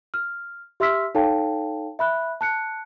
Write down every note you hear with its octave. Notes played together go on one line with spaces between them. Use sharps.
F6
G4 E5 C6 E6 F6 B6
D#4 A4 C#5 F5 G5 A5
E5 B5 F#6
A5 F#6 C#7